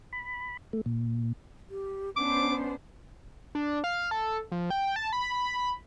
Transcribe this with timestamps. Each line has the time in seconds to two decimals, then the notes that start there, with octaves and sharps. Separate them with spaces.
0.12 B5
0.73 A3
0.86 A#2
1.70 G4
2.17 B3 C#4 D4 C5 D6
3.55 D4
3.84 F5
4.11 A4
4.52 F3
4.70 G5
4.96 A5
5.13 B5